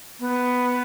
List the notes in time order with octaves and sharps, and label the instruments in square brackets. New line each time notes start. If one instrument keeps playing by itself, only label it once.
[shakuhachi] B3